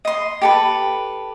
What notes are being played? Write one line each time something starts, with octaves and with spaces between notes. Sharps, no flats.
D#5 C6
G4 A4 B4